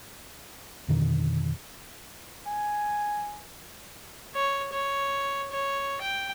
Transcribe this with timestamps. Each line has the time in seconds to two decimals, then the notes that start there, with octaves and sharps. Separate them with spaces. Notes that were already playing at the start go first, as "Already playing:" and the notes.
0.88 F2 B2 D3 D#3
2.47 G#5
4.35 C#5
4.73 C#5
5.51 C#5
6.01 G5